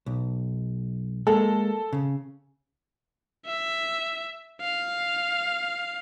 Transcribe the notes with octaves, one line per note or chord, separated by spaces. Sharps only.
B1
G#3 A#3 A4
C#3
E5
F5